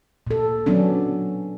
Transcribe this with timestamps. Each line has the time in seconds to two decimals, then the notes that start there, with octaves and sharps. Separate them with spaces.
0.27 A#2 A4
0.66 F#3 B3 C#4 D4